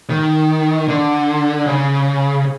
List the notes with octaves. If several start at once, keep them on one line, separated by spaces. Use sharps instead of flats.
D#3
D3
C#3